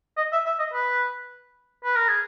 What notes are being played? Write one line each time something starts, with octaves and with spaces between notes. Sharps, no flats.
D#5
E5
E5
D#5
B4
B4
A#4
G#4